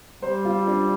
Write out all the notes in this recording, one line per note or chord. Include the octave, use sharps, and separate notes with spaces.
G3 C5
F4
D4